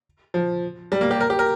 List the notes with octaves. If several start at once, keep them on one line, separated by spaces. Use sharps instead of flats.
F3
G3
A#3
G4
A#4
G4
A#4